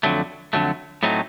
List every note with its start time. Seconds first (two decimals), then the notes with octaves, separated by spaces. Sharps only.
0.03 F2 D3 F#3 A3
0.53 F2 D3 F#3 A3
1.03 A2 F#3 A3 C4 D#4